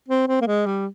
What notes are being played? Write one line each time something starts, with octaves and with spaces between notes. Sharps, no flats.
C4
C4
A#3
G#3
G3